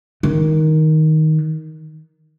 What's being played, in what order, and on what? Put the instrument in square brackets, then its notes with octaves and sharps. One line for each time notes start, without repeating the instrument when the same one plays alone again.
[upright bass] D#3